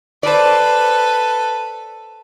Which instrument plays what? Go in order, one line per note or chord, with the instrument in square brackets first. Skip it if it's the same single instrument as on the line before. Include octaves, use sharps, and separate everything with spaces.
[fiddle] A4 B4 [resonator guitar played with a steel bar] C5 D5